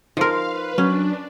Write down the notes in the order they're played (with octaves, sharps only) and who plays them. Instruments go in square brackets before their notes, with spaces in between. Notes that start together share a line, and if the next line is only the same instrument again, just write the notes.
[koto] F3 A#4 [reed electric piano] D#4 C5 C6 [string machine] F5
[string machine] B4
[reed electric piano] F#3 [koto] C#4 [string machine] D4